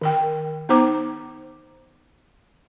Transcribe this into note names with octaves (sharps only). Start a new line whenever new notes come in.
D#3 A#4 G5
B3 D#4 C5 A#5 D6